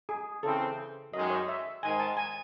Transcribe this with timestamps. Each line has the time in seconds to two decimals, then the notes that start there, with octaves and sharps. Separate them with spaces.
0.09 G#4
0.43 C#3 E3 C4 A4
1.13 F#2 D#3 G#3 D#5
1.30 C#5
1.48 E5
1.83 G#2 D#3 G#3 G#5
2.00 A5
2.17 G#5